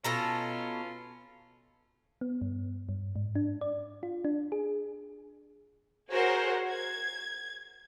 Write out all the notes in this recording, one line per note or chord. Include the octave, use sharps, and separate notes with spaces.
B2 C#4 F4 A4 A#5
B3
G2
G2
G#2
D4
D5
F4
D4
G#4
F#4 G#4 A#4 C5 C#5 F#5
G#6